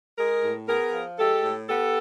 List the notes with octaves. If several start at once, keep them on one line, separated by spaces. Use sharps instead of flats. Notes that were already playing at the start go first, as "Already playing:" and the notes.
G#3 G#4 A#4
A2
B3 G#4 A#4
F3
G#3 G4 A4
A2
B3 G4 A4